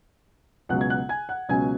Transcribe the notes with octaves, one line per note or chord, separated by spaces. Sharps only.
C#2 B2 F#3 C#4 F#5 F#6
G#6
F#5 F#6
G#5 G#6
F#5 F#6
C#2 B2 F#3 C#4 G#5 G#6